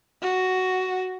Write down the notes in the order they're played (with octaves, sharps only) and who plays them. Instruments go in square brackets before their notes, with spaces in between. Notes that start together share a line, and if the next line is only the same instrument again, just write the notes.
[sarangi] F#4